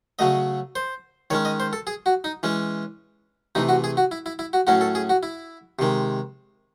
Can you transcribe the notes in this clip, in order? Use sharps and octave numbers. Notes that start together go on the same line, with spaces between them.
C#3 F#3 A3 D#5
C5
D#3 G#3 C#4 C#5
D#5
C5
A4
G#4
F#4
D#4
E3 G#3 C#4
C3 E3 A3 D#4
F#4
G#4
F#4
E4
E4
E4
F#4
A2 F#3 C#4 F#4
A4
G#4
F#4
E4
C3 D#3 G#3